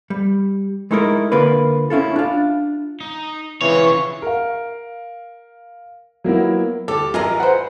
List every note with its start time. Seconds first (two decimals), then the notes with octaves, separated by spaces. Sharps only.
0.10 G3
0.91 G#3 A3 D#4 E4 G#4 A#4
1.32 D3 A#3 F4 A#4 B4
1.90 C#4 E4 F4 A4
2.16 D4 F4
3.01 D#4
3.61 C#3 E3 C4 F4 C#5
4.22 A#4 F5
6.24 F#3 A#3 B3 E4
6.88 D2 G4 A4
7.14 A1 F4 G#4 A#4 D#5 A#5
7.40 B4 C5 F#5